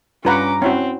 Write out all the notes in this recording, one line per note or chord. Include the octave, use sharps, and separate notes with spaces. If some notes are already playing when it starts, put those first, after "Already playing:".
G2 C#4 F4 B4 F#5 A#5 D6
C4 C#4 E4 F#4